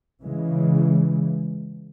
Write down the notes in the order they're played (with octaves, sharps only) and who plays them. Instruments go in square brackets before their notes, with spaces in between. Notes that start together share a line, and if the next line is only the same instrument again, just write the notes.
[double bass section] C#3 E3 G#3